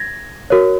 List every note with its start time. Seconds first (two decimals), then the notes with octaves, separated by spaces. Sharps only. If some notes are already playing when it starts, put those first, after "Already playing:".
Already playing: G#6 A#6
0.50 F#4 A#4 C#5